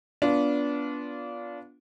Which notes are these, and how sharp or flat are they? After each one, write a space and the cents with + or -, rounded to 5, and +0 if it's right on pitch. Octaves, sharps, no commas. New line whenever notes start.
B3 -10 D4 -20 F4 +0